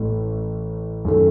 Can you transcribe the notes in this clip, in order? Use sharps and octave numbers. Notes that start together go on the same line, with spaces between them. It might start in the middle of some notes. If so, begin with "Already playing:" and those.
Already playing: A1 A2 A3
F#2 D#3 A3